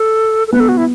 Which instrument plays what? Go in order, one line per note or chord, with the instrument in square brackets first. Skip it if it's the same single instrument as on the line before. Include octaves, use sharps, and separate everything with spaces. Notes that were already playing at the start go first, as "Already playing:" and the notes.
Already playing: [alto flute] A4
A4
[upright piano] B3 [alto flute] B4
[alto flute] A4
F#4
E4